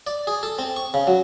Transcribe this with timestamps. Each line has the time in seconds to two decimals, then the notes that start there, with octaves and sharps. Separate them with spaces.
0.07 D5
0.27 G#4
0.43 A4
0.59 C4
0.76 C#6
0.94 C#3
1.07 F#3